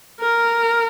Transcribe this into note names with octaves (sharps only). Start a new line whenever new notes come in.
A#4